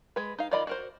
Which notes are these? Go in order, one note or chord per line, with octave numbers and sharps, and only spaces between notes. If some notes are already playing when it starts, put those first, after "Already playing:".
G#3 B4
D#4 F5
D#3 F4 D5 D#5 B5
F#4 A#4 C5